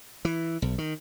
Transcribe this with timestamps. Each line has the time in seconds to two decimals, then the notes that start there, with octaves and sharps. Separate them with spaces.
0.25 E3
0.62 B1
0.78 D#3